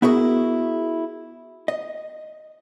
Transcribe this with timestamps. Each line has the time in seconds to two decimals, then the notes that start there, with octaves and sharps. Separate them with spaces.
0.02 B3 E4 F#4 G#4 A#4
1.68 D#5